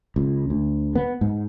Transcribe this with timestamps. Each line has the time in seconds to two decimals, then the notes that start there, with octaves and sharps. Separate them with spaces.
0.16 C#2
0.50 D2
0.95 B3
1.21 G#2